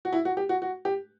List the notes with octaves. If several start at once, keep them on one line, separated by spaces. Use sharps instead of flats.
F#4
E4
F#4
G4
F#4
F#4
G4